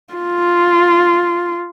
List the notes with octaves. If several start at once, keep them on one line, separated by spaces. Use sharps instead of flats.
F4